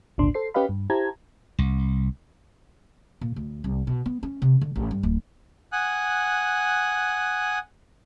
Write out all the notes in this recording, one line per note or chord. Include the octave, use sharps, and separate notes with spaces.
G#1 D2 A#2 D4 C6
A4 C5 C7
C#4 G4 B4 D#5 F5 B5
G2
E4 G4 C5 A5 A#5 G#6
C2
A#2
D2
C2
B2
B3
C#4
C3
D3
A1
G2
D1
F#5 G#5 D#6 F#6